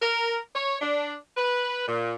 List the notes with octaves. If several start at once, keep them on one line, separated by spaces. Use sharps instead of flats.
A#4
C#5
D4
B4
A#2